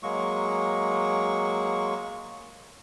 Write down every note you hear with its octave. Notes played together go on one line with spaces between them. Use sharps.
F#3 G#3 A#3 C#6